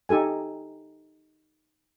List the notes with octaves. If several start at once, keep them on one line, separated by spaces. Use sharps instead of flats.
D#4 G4 A4 G#5